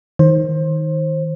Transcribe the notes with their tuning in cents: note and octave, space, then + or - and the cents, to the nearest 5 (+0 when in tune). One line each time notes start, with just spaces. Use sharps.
D#3 +20 C5 +25